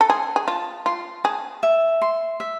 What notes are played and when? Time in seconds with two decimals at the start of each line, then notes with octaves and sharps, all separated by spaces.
0.01 A4
0.09 G#4 C6
0.36 G#4
0.47 F4 A5
0.86 F4 C6
1.24 G#4 A5
1.63 E5
2.02 C6
2.40 E5